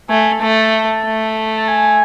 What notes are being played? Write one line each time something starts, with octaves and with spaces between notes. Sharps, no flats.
A3 G#5
A3 A5
A3
A5
G#5